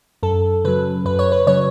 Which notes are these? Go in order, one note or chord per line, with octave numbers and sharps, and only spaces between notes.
F#2 A4
C#3 F#3 B4
F#2 B4
C#5
B4
C#3 F#3 C#5